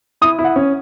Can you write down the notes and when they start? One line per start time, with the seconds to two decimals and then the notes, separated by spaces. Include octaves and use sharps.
0.21 E4 D#6
0.39 E4
0.44 F#5
0.56 C#4